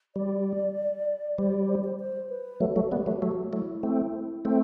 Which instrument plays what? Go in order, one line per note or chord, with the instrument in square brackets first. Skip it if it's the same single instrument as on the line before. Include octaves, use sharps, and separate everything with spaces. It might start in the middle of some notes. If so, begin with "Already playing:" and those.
[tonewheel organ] G3 [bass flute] D5
[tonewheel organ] G3 [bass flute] C5
[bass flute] D5
C5
C5
C5
B4
[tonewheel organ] F#3 A3 [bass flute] A4
[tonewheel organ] F#3 A3
[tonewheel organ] G3 B3 [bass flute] G4
[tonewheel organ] F#3 A3
[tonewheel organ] F#3 A3 [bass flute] F#4
[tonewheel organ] F#3 A3 [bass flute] E4
[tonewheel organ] A3 C4
A3 C4